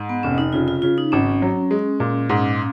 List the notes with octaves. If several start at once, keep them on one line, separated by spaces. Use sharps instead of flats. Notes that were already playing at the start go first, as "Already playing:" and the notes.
Already playing: G#2
B3
F1 C#4
D#4
C#3 F4
F4
C#3 F4
D#4
G#1 C#4
F#3
G#3
A#2
G#2